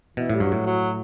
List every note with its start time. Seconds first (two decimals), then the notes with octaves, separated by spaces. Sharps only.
0.17 B2 E3
0.29 A2 G3
0.40 G2 F#3
0.52 A2
0.66 F#3